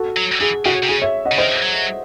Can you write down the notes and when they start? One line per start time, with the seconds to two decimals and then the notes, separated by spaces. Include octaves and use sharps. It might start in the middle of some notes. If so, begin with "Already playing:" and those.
Already playing: F#4 A4
0.17 F#3
0.40 E3 G#4
0.65 C#3 F#4
0.83 C3
0.89 C#3 G#4
1.02 C#5 E5
1.25 D#5 F#5
1.32 C#3
1.38 D#3 C5 D#5
1.63 F#3